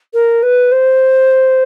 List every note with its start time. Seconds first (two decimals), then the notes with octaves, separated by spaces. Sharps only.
0.13 A#4
0.42 B4
0.71 C5